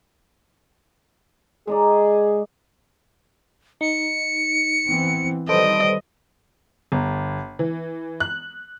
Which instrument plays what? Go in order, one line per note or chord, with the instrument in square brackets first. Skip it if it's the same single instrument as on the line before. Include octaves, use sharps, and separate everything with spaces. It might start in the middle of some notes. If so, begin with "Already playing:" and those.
[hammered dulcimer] G#3 D#4 D5 [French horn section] G#4
[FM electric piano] D#4 [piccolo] C#7
[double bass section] E3 B3 C4
[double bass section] D#3 G3 [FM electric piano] A4 B4 C5 [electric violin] D#5 [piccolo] D7
[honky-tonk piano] G1
E3
F#6